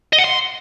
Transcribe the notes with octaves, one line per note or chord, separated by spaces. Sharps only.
D#5
F#5
C6